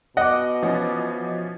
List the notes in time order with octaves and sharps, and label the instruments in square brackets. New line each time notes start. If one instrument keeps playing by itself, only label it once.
[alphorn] B2 [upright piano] D#5 D6 [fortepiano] F#5
[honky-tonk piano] E3 F3 C#4